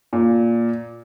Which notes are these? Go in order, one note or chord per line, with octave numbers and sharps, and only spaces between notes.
A#2